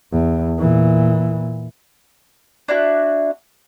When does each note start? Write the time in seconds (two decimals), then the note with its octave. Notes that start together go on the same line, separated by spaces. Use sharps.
0.12 E2
0.60 A#2 E3
2.68 D4 E4 F#4